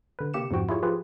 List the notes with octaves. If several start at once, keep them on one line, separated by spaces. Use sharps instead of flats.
D3 B4
C3 A#3 G4 C#7 E7
F2 G#2 F3 F#4 G5
E4 F4 G4 G#4 C#5
F3 F4 G4 G#4 B4